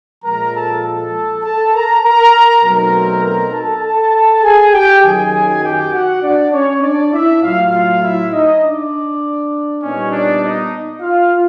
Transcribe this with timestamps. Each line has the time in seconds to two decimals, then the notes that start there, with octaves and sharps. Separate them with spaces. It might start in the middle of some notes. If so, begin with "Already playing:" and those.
0.24 A#2 F3 G#3 A#4 A#5
0.55 A4 A5
0.84 A4 A5
1.44 A4 A5
1.74 A#4 A#5
2.03 A#4 A#5
2.63 B2 F#3 A3 C4 D#4 A#4 A#5
3.24 A#4 A#5
3.53 A4 A5
3.84 A4 A5
4.43 G#4 G#5
4.73 G4 G5
5.03 F#2 D#3 F#3 G#4 G#5
5.63 G4 G5
5.93 F#4 F#5
6.23 D4 D5
6.53 C#4 C#5
6.83 D4 D5
7.13 E4 E5
7.42 A2 F#3 A3 F4 F5
7.73 F4 F5
8.02 E4 E5
8.32 D#4 D#5
8.62 D4 D5
9.82 A#2 G3 B3 C#4 D#4 C#5
10.12 D4 D5
10.42 D#4 D#5
11.01 F4 F5